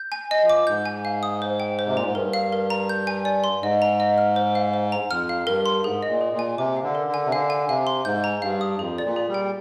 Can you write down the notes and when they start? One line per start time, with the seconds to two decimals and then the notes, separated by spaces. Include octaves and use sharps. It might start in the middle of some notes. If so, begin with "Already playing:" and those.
Already playing: G6
0.12 G#5
0.31 D#5
0.43 F3
0.50 D6
0.67 G#2 G6
0.86 G#5
1.05 F5
1.23 D#6
1.42 C5
1.60 G5
1.79 C5
1.87 C3
1.95 A#2 A#5
2.05 G#2
2.14 G2 A#4
2.33 F5
2.52 A#4
2.70 A#5
2.89 G6
3.07 G#5
3.25 D5
3.44 C6
3.62 G#2 D#5
3.82 A#5
4.00 D#5
4.18 F6
4.36 C5
4.55 F5
4.74 C5
4.92 A#5
5.11 F2 F6
5.29 F5
5.47 G2 A#4
5.66 C6
5.84 G#2 G#4
6.03 D#5
6.08 A#2
6.21 G#4
6.33 A#2
6.39 G#5
6.57 C3 D6
6.77 F5
6.83 D3
6.95 A#4
7.07 D3
7.14 G#5
7.26 C3
7.32 D3 F5
7.50 G#5
7.68 C3 F5
7.87 C6
8.05 G#2 G6
8.24 A#5
8.42 G2 F5
8.61 D#6
8.79 F2 G#4
8.98 D5
9.04 A#2
9.16 G#4
9.28 G3
9.34 G5